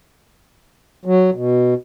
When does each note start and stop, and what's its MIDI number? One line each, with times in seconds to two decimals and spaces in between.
1.05 1.30 54
1.35 1.74 47